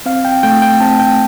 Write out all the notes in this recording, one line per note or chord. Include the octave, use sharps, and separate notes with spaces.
C4 F5
G5
A3 G5
G5
C4 A5
G5